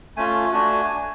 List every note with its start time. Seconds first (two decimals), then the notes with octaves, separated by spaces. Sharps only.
0.17 A3 C#4 F4 G#5
0.52 A3 D4 F#4